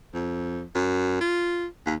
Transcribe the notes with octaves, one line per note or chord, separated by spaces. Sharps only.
F2
F#2
F4
D#2